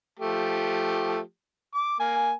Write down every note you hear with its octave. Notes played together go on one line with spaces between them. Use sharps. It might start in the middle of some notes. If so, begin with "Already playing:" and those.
F3 A3 G4
D6
A#3 G#5